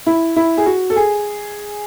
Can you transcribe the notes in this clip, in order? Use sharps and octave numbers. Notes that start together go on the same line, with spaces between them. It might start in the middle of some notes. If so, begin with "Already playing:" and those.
E4
E4
G#4
F#4
A4
G#4